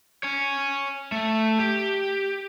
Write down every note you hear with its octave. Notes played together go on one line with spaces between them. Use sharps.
C#5 G#5
A3
G4